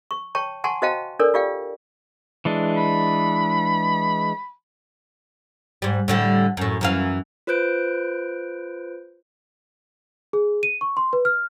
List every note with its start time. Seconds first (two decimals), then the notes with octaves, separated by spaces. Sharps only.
0.11 C#6
0.35 C#5 G5 A5 C#6
0.64 F#5 G#5 A5 C6 C#6
0.82 F#4 C5 D#5 F5 G5 A5
1.19 D4 A4 A#4 C#5 D5
1.34 F4 G4 D5 F5 G5
2.45 E3 G#3 D4
2.76 B5
5.82 G#2 G3
6.08 A2 D3 G3
6.57 F#2 A2
6.81 F#2 E3 F5
7.47 F4 B4 C5 F#6 G6 D7
10.33 G#4
10.63 D#7
10.81 C#6
10.97 C6
11.13 B4
11.25 F6